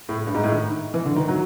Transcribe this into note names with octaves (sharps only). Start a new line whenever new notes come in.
A2
G2
G#2
A2
D#3
E3
D3
D#3
F#3